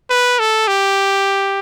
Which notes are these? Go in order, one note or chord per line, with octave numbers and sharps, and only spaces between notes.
B4
A4
G4